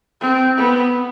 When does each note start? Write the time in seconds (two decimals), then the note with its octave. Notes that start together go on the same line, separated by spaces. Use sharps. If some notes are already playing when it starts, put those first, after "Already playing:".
0.21 C4
0.58 B3